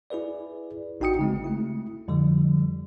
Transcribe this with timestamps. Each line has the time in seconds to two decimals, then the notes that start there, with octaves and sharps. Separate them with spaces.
0.10 E4 G#4 B4 D5
1.00 A1 D#4 F#4 G5 D#6 C#7
1.19 C#3 G#3 C4
1.44 A3 E4
2.08 F2 D3 F3 G3